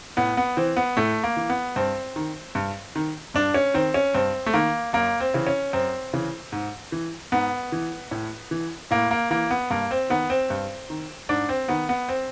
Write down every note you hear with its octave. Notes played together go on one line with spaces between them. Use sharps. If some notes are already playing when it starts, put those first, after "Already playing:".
A2 B3
B3
E3 C4
B3
A2 A3
A#3
E3
B3
G2 C4
D#3
G2
D#3
G2 D4
C#4
D#3 C4
C#4
G2 C4
A3
D#3 A#3
F#2 A#3
C4
C#3 E3
C#4
F#2 C4
C#3 E3
G#2
E3
G#2 B3
E3
A2
E3
A2 A#3
A#3
E3 A#3
B3
G2 A#3
C4
D#3 B3
C4
G2
D#3
G#2 D4
C4
D#3 B3
B3
C4